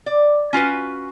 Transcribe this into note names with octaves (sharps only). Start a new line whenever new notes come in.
D5
C#4 F4 F#4 B4